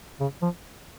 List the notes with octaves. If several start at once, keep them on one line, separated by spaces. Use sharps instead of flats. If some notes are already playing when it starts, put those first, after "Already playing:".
C#3
F3